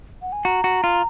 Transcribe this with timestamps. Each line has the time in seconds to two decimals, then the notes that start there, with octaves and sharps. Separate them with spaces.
0.22 F#5
0.33 G#5
0.45 F#4 A#5
0.64 F#4
0.84 F4